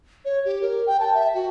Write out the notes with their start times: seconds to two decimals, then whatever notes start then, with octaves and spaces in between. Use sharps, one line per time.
0.25 C#5
0.45 G4
0.62 A#4
0.87 G5
1.00 A5
1.14 E5
1.34 F#4